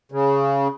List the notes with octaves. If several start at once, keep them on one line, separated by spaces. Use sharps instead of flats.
C#3